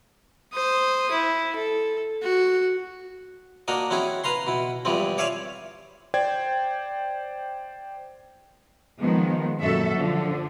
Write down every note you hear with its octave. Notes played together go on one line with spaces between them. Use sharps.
C5 D#6
E4
A4
F#4
A#3 D4 F#4 A#4 D#5
C4 C#4 E4 F#4 G#4
B4 F5 A#5 C6
B2 E4
E2 G2 E3 F3 G#3 C4
C#5 D5 E5 F5 G#5 C#6
C5 D5 G5 G#6
D#3 F3 G#3 B3
F#2 A#2 F#4 A4 E5
D3 F3